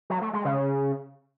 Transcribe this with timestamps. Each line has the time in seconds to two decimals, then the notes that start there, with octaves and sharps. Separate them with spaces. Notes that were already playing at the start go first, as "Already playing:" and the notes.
0.10 F#3
0.22 A3
0.33 G#3
0.45 C#3